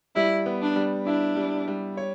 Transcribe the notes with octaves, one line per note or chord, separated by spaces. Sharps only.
G3 E4
B3
D4
G3
D4 E4
G3
G3
C#5